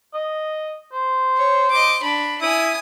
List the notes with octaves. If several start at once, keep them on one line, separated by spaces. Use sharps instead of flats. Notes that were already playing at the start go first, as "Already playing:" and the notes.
D#5
C5
C#5
D#5 D6
D4 B5
E4 G#5 D#6